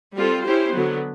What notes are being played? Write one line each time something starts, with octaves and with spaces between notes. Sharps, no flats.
G3 C4 F4 A4
C#4 E4 G4 C5
D3 F#3 B3